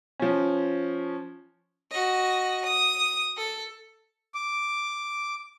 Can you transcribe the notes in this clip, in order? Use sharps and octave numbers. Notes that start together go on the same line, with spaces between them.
F3 C#4
F#4 D#5
D#6
A4
D6